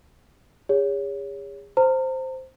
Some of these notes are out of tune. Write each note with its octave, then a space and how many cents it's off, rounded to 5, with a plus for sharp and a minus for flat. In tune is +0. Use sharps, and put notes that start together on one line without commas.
G#4 -40 C#5 +20
C5 +0 A#5 -40